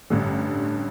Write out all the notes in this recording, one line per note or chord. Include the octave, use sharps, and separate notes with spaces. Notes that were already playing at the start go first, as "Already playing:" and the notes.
A1 G2 D3